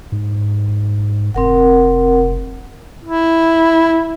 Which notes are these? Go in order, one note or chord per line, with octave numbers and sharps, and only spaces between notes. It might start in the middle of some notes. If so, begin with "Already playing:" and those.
G#2
F1 C4 A#4 F#5
E4